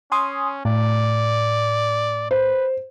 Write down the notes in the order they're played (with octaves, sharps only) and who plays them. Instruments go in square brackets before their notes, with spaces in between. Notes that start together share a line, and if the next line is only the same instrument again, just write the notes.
[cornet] C#4 [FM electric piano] G#5 C6 D#6
[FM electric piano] A2 [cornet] D5
[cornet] B4 [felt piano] C5